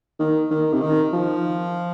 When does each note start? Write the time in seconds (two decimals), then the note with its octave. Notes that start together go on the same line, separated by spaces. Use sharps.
0.19 D#3
0.50 D#3
0.73 C3
0.81 D#3
1.13 F3